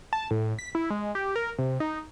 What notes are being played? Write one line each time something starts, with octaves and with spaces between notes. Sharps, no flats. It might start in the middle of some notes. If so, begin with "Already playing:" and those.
A5
A2
B6
E4
G#3
G4
A#4
C3
D#4